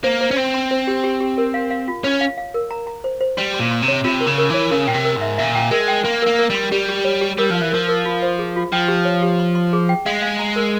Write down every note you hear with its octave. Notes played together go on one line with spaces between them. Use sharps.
A#3 C5
C5
C#4
C4 C6
C6
C5
G4
G4
G4
A#4
F5
F5
F4
C#4 C#5
F5
F5
A#4
A#5
A#5
C5
C5
G3 C6
C6
A#2
C6
C3
C#5
C3 F4
A#4
C#3
A#4
E3 C#5
C#3 A#4
A#2 G5
C3
A#4
G#2
E5
A#2 E5
G5
G#3 A#4
G5
A#3 C6
A#3 A#4
A#4
G3 C6
G3 G4
G4
C#5
G4
G3 A#4
F3 F5
E3
F3 A#4
A#4
F4
C5
G#4
F4
F3 G5
G4
C#5
G4
C6
C6
G#4
G5
G#3 F5
F5
A#5
A#4